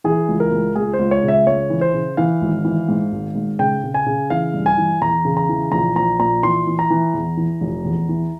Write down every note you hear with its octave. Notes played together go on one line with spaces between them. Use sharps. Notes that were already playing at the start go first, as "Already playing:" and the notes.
E3 G#4
C#2
A#4
C#2
C#2 G#4
C5
C#2
C#5
C#3
E5
C#2 C#5
E3
C5
C#3
E3 F5
G#1
E3
G#2
G#1
G#2
C#3 G5
C#3
G#5
C#3
E3 F5
G2
G#5
E3
E2 A#5
C#3
A#5
E3
A#1 A#5
A#1 A#5
A#2 A#5
E3 C6
E3
A#5
E3
E2
E3
F1
E2
E3